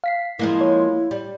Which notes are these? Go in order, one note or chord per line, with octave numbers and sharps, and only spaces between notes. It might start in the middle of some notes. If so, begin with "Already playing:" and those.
F5 B6 C7
F3 G#3 A#3 E4
C#5
G3